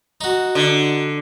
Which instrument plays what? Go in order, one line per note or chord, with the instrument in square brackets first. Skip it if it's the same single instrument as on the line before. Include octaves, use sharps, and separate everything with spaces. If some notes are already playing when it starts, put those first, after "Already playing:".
[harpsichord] D#4 F#4
[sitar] D3